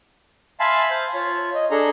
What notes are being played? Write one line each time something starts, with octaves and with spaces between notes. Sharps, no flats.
E5 F5 G#5 A5 B5 C6
C5 F5
F4 C#5
D#5
D4 G#4 A4 A#5